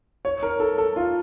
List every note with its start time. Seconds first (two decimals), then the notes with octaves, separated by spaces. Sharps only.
0.25 C#5
0.43 A#4
0.60 A4
0.78 A4
0.96 F4